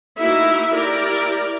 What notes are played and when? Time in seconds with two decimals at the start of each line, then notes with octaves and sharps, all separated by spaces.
0.18 A#3 D#4 E4 F#4 E5
0.74 E4 G4 A#4 D5